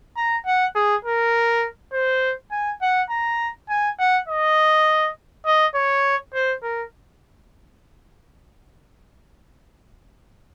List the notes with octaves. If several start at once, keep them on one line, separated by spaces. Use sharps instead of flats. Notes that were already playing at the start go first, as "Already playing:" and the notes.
A#5
F#5
G#4
A#4
C5
G#5
F#5
A#5
G#5
F#5
D#5
D#5
C#5
C5
A#4